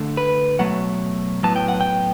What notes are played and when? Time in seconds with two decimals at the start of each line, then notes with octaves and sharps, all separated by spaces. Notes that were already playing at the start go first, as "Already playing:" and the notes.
Already playing: D3 A3
0.17 B4
0.59 B2 F#3 A3 F#5
1.43 A2 F#3 B3 A5
1.56 G5
1.68 F#5
1.81 G5